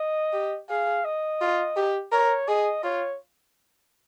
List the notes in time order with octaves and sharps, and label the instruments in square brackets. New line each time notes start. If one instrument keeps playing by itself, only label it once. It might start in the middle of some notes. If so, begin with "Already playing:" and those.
Already playing: [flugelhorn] D#5
[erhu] G4
[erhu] G#4 [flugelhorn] F5
[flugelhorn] D#5
[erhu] F4
G4
[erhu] A#4 [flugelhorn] C#5
[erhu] G#4 [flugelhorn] D#5
[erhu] F4 [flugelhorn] C#5